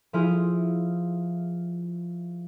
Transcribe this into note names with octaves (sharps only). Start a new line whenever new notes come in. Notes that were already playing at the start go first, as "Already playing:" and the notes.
F3 E4 F4 G#4